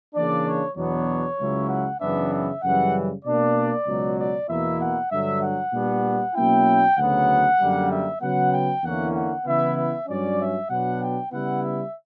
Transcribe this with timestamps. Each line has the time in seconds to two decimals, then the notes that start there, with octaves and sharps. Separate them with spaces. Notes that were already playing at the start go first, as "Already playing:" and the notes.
0.14 C#3 E3 A#3 D4 D5
0.46 C#5
0.76 E2 B2 F#3 B3 D4 C#5
1.39 C#2 C#3 F#3 C#4 E4
1.70 F#5
2.00 F#2 C#3 E3 B3 D4 E5
2.32 E5
2.63 F#2 C#3 E3 G3 F#5
3.24 B2 A#3 D4 D5
3.87 C#2 B2 F#3
4.18 D5
4.49 E2 B2 A#3 E4 E5
4.80 F#5
5.11 G2 D3 F#3 E5
5.42 F#5
5.73 A#2 G3 B3 D4
6.35 B2 F#3 A#3 C#4 E4 G5
6.97 D2 C#3 F#3 B3 F#5
7.60 F#2 D3 G3 A#3
7.90 E5
8.22 C#3 F#3 B3 F#5
8.53 G5
8.83 E2 D3 A#3 C#4 E4 F#5
9.14 F#5
9.46 C#3 E3 B3 E4 E5
9.76 E5
10.08 G2 F#3 C#4 D5
10.40 E5
10.69 B2 F#3 B3 D4 F#5
11.01 G5
11.32 C#3 G3 B3 E4 F#5
11.63 E5